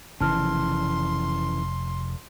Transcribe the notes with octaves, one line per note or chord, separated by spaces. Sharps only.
F1 C#3 E3 A5 C6 F6